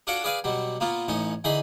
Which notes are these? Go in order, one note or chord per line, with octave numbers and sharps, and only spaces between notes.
D4 F4 F#4 A4 C#5 D6
G#4 B4 D5 F5 G#5
B2 F#3 G3
A#2 A#3 B3 F4
A1 A2 C#4 D#4
D3 E3 D#4 G#4 B5 C6